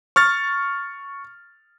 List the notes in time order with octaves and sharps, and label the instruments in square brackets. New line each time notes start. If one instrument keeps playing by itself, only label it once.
[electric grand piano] C#6 F6 A6